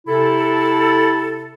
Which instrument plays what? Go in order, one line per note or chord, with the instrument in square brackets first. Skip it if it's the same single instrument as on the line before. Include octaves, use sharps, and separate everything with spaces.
[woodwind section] C3 E4 A4